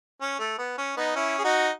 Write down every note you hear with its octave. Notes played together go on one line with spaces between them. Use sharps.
C#4
A3
B3
C#4
B3 D#4
C#4 E4
G#4
D#4 F#4